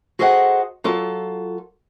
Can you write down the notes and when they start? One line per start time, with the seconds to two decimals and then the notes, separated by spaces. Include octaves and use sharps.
0.19 F#4 G#4 A4 C5 D#5 F#5
0.84 F#3 F4 A4